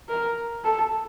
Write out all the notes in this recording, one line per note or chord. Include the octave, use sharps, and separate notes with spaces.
A#4
A4